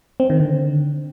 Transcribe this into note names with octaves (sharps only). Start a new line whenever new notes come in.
C4
D#3
D3